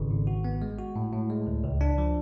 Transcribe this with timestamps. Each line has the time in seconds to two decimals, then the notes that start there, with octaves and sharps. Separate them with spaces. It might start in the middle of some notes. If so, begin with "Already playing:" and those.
Already playing: G#1 C#3
0.10 G#1
0.27 F#4
0.44 B3
0.62 G#3
0.78 F#4
0.96 A2
1.13 A2
1.30 G#3
1.47 D2
1.64 C#2
1.81 D4
1.98 F3